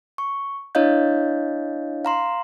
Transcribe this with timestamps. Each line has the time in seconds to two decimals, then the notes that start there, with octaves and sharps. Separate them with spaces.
0.18 C#6
0.75 D4 E4 C#5 D#5 F5 G6
2.05 F5 A#5 C6